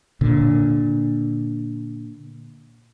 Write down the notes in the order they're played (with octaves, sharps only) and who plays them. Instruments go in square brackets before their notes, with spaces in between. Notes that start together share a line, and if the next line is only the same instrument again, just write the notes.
[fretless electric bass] A#2 D3